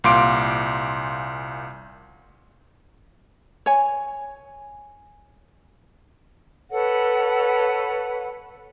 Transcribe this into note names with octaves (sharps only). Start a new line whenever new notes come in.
C2 A#2 F5 C6 D6 D7
C#5 G#5
A4 B4 C#5 F#5